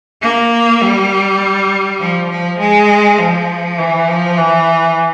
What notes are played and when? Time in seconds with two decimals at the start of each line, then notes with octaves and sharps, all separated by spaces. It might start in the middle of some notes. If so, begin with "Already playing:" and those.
0.22 A#3
0.81 G3
2.00 F3
2.30 F3
2.59 G#3
3.18 F3
3.78 E3
4.08 F3
4.37 E3